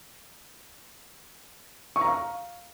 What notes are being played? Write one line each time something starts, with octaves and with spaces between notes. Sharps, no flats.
C#6
A#5
F5